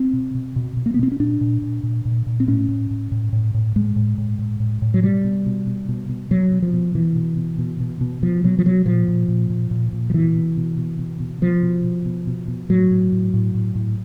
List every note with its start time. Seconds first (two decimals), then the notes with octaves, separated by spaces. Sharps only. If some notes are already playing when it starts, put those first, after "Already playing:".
Already playing: C4
0.13 B2
0.35 B2
0.56 B2
0.77 B2
0.86 A#3
0.94 B3
0.99 B2 C4
1.12 C#4
1.20 A#2 D4
1.41 A#2
1.62 A#2
1.83 A#2
2.05 A#2
2.26 A#2
2.40 C4
2.48 A2 C#4
2.68 A2
2.91 A2
3.12 A2
3.33 A2
3.54 A2
3.76 A2 G#3
3.96 A2
4.18 A2
4.39 A2
4.60 A2
4.82 A2
4.94 F#3
5.03 B2 G3
5.24 B2
5.46 B2
5.67 B2
5.88 B2
6.09 B2
6.31 B2 F#3
6.52 B2
6.62 F3
6.73 B2
6.95 B2 E3
7.16 B2
7.37 B2
7.59 B2
7.80 B2
8.01 B2
8.23 B2 F3
8.44 B2 F#3
8.59 F3
8.65 B2 F#3
8.86 A#2 F3
9.08 A#2
9.28 A#2
9.50 A#2
9.71 A#2
9.93 A#2
10.10 F3
10.14 B2 E3
10.36 B2
10.57 B2
10.78 B2
10.99 B2
11.20 B2
11.41 B2 F3
11.63 B2
11.84 B2
12.06 B2
12.27 B2
12.48 B2
12.69 A2 F#3
12.91 A2
13.12 A2
13.34 A2
13.55 A2
13.75 A2